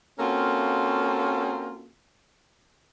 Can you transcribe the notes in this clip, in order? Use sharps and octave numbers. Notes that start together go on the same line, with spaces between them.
A#3 C4 C#4 F4 F#4 A4